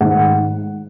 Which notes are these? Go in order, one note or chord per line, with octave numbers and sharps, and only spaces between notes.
G#2 D#3 F#5